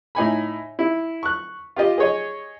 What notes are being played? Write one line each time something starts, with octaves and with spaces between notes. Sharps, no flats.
A2 D#4 G#5 B5
E4
C#6 F#6
F4 G4 D#5
G#4 C#5 D#5